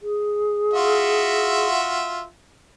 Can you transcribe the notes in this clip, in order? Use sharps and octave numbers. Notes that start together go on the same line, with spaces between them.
G#4
F4 F#4 E5